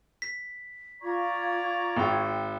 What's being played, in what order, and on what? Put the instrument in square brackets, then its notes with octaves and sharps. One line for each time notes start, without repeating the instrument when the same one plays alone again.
[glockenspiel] B6
[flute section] F4 C#6 G#6 [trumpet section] D5 A#5
[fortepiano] G#1 G5